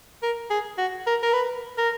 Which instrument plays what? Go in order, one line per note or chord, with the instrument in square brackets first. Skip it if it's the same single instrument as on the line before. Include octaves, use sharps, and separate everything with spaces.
[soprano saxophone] A#4
G#4
F#4
A#4
A#4
B4
A#4